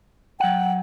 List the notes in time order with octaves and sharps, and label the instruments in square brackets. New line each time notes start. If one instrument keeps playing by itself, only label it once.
[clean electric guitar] F#3 F#5 [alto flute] G5